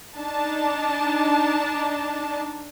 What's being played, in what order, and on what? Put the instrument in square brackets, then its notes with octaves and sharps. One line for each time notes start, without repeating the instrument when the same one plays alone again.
[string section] D4 D#4 A5